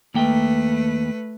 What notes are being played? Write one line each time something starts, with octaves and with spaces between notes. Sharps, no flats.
D#2 A3 A#3 B4 G5